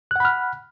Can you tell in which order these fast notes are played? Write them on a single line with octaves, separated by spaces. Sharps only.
F#6 F#5 B5 F6